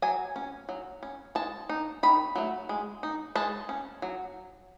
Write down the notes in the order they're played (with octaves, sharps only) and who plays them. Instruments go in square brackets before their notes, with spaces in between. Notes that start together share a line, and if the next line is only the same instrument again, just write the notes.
[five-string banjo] F#3 G#5
C#4
F#3
C#4
G#3 A5
D#4
D#3 B5
F#3 A3
G#3
D#4
G#3 A5
C#4
F#3